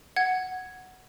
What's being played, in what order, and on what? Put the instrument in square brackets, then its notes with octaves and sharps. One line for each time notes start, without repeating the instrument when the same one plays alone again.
[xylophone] F#5 G#6